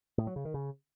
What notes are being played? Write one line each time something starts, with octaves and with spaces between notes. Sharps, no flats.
A2
F#3
C#3
D#3
C#3